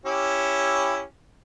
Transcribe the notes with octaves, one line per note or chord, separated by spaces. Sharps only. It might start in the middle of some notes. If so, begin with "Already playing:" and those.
C#4 E4 G4